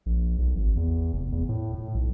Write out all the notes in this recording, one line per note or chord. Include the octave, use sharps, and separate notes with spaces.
A#1
B1
G#1
E2
F1
E2
A2
A2
B1